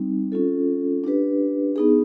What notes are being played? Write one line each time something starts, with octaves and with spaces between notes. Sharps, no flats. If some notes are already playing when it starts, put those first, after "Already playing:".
Already playing: G3 C4 D#4
C#4 F4 A4
D4 G4 B4
B3 D#4 G#4